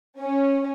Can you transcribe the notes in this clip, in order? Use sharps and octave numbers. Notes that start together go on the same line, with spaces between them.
C#4